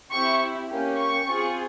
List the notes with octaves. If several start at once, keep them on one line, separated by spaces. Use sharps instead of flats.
C4 E4 G4 C#6
A#3 C#4 G4
C#6
C4 F4 G#4